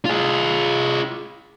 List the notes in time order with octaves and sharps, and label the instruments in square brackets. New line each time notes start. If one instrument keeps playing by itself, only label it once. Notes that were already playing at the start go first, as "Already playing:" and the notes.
[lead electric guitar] F4 G#4